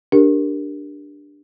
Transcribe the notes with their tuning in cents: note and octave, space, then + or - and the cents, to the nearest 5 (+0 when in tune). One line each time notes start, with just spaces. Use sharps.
D4 +0 G4 +5 A#4 +0